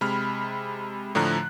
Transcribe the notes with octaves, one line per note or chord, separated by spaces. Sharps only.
C3 G#3 B5 F6
A2 D3 F3 A#5 F#6